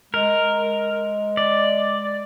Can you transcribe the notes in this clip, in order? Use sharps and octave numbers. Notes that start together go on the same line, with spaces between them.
G#3 A#4
D5